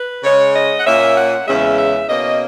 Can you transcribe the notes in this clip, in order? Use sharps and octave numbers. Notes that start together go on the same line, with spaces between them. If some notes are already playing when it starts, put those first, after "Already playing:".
Already playing: B4
C#3 G#3 C#4 C#5
D#5
F#5
A#2 A#3 C#4 E5
F#5
E2 C#3 G#3 C#4 E5
E5
B2 A#3 C#4 D#5